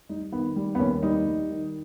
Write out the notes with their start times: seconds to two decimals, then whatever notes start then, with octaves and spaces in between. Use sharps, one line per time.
0.09 G3 D#4
0.32 D#3 B3
0.56 G3
0.75 B3
0.79 D#2 C#4
1.03 G3 D#4
1.26 G3
1.50 D#3